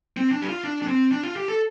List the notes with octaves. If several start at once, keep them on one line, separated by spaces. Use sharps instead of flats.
C4
D4
G4
F4
D4
D4
C4
D4
F4
G4
A4